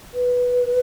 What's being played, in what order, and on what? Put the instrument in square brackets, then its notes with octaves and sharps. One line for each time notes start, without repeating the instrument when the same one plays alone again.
[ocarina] B4